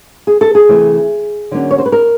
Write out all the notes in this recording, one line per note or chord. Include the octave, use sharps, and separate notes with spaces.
G#4
A4
G#4
C3 E3 A3 C4
D3 F#3 A#3 C#4
C#5
C5
B4
A#4